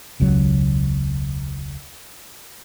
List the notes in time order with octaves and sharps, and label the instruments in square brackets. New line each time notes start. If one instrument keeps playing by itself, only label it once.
[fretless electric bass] E1 C#2 C#3 F#3